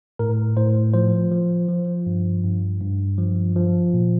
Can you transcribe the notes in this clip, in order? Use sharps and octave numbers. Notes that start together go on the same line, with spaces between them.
A2 A#4
A2 C5
F3 C5
F3
F3
G2
G2
G2
F3
F3
A#2